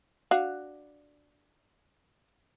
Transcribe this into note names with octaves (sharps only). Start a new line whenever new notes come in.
D4 F#4 F5